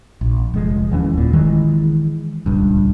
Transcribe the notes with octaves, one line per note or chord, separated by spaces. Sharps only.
A#1
F1 F3 G#3
D#2 E3 G#3 C#4
F#1 A#2
D#3 E3 G#3
D#1 C#2 G2